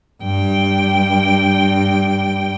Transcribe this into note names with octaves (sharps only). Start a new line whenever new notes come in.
G2 G5